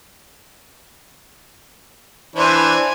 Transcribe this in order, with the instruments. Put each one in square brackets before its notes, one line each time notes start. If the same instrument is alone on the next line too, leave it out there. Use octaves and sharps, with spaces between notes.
[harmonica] E3 D4 [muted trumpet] C5 [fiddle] G#5